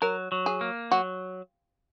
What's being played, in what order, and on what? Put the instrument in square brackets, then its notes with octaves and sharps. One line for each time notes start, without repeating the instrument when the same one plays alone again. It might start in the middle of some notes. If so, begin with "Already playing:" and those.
[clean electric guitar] F#3 [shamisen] A#4
[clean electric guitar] F#3
[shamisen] G#4
[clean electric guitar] A#3
[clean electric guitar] F#3 [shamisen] F#4